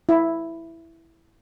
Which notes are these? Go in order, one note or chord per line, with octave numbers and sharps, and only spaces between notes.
E4